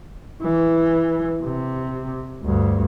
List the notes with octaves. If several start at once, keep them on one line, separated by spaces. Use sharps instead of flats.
E3
C3
D2 G2